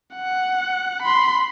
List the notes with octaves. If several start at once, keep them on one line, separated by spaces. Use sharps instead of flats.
F#5
B5 C6